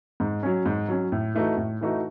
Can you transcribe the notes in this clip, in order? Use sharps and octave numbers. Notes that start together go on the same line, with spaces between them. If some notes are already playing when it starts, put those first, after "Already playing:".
G#2
F#3 C#4
G#2
F#3 C#4
A2
E3 A3 D#4 F#4
A2
E3 A3 D#4 F#4